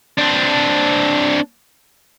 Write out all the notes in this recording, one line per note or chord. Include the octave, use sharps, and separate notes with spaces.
C4 D4